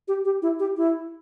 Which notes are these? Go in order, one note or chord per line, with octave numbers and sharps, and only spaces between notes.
G4
G4
E4
G4
E4